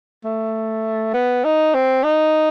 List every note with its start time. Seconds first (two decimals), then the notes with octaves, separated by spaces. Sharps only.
0.25 A3
1.14 B3
1.45 D#4
1.74 C4
2.04 D#4